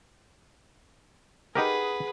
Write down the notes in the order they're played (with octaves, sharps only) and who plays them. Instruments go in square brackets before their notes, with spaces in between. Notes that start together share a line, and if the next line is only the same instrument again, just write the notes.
[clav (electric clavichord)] D#4 G4 A#4 [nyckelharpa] G#4 [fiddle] B4 [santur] F#5 D#6